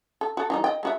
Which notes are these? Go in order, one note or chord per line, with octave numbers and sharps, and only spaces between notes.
A4
F#4 A4
E3 G3 D#4
D#5 G5
G#3 F#4 E5